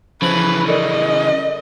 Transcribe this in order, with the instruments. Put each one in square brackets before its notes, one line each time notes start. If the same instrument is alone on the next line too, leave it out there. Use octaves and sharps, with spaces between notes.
[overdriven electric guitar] C#3 E3 [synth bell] F3 B5 F#7 [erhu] B4
[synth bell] A4 A#4 D5 [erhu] D#5